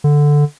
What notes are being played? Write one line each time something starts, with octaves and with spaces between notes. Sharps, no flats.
D3